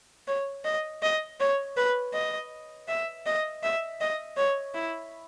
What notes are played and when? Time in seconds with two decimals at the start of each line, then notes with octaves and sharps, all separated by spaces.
0.28 C#5
0.65 D#5
1.03 D#5
1.40 C#5
1.77 B4
2.14 D#5
2.89 E5
3.26 D#5
3.63 E5
4.01 D#5
4.37 C#5
4.75 E4